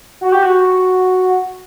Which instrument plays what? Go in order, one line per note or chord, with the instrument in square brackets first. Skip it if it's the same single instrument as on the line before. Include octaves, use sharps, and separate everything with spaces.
[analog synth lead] F#4
G4
F#4